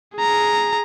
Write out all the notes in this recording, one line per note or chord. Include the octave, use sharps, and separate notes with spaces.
G#4 A#5